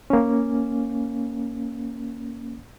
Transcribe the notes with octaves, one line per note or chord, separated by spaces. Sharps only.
A#3 C#4